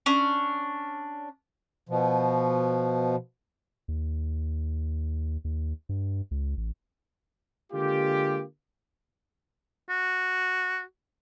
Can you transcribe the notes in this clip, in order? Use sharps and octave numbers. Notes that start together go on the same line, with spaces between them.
C#4 D4
B2 F3
D#2
D#2
G2
C#2
A1
D3 G#3 A#3 F4 G4
F#4